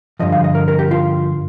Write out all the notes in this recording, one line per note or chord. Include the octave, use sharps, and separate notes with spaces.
G2 D3 F3 D#5
F5
D#5
A#4
A#4
G4
F4